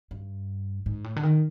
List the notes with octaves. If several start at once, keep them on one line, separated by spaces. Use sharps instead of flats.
G2
G#2
A2
D3
D#3